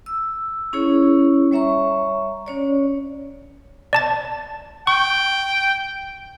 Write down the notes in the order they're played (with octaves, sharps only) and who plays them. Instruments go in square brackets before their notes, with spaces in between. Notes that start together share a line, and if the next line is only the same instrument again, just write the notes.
[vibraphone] E6
C#4 E4 G#4 C#5
G3 C#5 E5 A#5 C#6
C#4 C#5 D5
[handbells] D5 A5 A6
[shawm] G5 [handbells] C#6